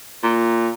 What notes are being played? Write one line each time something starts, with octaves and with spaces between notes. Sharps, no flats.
A#2